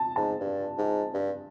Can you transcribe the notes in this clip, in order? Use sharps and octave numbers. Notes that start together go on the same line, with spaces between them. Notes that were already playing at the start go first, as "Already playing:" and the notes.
Already playing: A5
G#2 A5
G2
G#2
G2